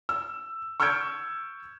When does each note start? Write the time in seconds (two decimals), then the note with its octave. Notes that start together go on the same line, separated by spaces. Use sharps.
0.09 E6
0.80 C#6 E6 F6 G6 G#6 D7